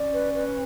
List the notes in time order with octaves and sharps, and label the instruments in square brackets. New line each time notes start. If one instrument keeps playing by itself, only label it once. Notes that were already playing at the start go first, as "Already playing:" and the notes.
Already playing: [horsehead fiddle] C#4 [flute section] D5
[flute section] B4
B4